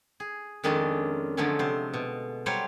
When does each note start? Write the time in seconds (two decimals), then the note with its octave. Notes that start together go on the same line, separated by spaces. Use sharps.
0.20 G#4
0.64 F2 D#3 G#3 C#4 D4 A5
1.37 D3 F3 F#3 G#3 A3 C#4
1.59 C3 C5
1.93 B2
2.46 F#3 G3 C5 C#5 F5